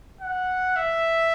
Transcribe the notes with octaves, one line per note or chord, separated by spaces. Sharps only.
F#5
E5